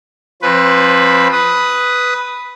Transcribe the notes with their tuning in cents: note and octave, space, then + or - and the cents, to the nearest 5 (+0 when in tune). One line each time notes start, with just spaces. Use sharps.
F3 +0 C4 +30 B4 +0
B4 +0 D#6 +10